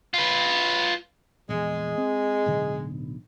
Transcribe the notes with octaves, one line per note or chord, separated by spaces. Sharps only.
F4 B4
A#1 E2 G#3
C4
D1 B1 D3